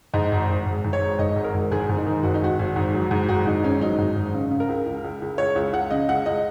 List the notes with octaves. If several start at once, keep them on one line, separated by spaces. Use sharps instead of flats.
G#2 D#5
G#1
G#1
G#1
G#2
C#5
G#1
G#2 D#5
G#1
A#4
G#1
G#2 G#4
G#2
D#4
D#3
G#1 F#4
D#4
G#1 F#4
G#1
G#2
F#3
G#2
G#1 F#4
G#2 D#4
G#1 C#4
F#3 D#4
G#2
G#1
C#3
C#3
A#4
C#2
C#2
C#2
C#2
C#2 C#5
C#2
C#2 F#5
C#3 D#5
C#2 F#5
C#2 D#5